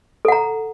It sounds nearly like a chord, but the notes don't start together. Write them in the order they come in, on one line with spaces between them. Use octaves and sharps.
A4 F#5 A#5